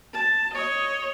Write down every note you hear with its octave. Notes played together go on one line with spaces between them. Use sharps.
A5
C#5 D#5